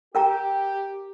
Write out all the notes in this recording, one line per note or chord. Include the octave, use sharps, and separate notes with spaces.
G4 A#4 G5 A#5